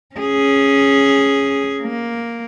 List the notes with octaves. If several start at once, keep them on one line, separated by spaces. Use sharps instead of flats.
C#4 G#4
A#3